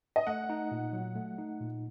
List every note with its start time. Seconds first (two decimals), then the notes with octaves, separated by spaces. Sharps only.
0.16 D#5
0.27 A3 F#5
0.50 D#4
0.71 A#2
0.93 F#3
1.15 A3
1.38 D#4
1.60 A#2